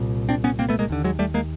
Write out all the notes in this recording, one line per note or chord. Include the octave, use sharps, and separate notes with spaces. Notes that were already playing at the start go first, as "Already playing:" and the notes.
Already playing: C2 A#2
C4 D4
B3 C#4
A#3 C4
A3 B3
G#3 A#3
D#2 D3
F#3 G#3
G3 A3
G#3 A#3